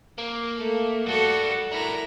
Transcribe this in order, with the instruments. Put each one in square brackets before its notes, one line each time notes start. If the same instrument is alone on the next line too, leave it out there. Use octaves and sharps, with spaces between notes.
[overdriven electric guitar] A#3
[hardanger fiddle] A3
[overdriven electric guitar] G2 G3 [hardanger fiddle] F#4 A4
[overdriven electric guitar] D4 A#4 [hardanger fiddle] E4 A#5